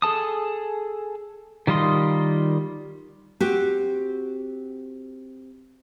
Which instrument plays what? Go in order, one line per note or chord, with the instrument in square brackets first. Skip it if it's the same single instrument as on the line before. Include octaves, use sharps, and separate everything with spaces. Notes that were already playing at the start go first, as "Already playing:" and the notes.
[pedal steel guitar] G#4 A4 A5 D#6
D#3 G3 F4 D#5 C6
[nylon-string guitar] C4 F#4 G4